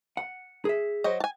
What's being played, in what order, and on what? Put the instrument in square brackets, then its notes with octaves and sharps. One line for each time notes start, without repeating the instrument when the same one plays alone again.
[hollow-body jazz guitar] F#5
G#4 E5
[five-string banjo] F#3 C5 D#5
G#5 A5